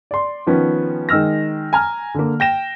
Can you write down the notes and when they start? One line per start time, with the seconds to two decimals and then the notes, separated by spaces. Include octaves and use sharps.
0.11 D5 C6
0.47 D#3 F3 B3 C#4
1.09 D#3 G#3 E6 F6 A#6
1.73 G#5 A#5 F6
2.14 D3 A#3
2.40 G5 A#6 E7